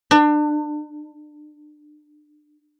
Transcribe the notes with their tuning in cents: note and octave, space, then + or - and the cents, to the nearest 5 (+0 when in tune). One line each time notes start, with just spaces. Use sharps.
D4 +30